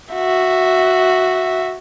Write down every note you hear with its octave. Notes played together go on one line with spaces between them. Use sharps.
F#4 E5